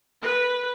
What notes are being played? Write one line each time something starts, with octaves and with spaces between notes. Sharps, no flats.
B4